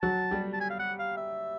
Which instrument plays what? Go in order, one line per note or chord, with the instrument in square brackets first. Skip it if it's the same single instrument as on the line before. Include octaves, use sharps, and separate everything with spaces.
[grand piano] F#3 F#4 [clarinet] A5
[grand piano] G3 G4
[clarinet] A5
G#5
F5
F#5
F5
E5